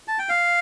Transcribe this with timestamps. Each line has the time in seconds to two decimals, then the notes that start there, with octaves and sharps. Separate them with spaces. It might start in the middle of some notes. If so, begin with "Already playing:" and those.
0.08 A5
0.19 G5
0.29 F5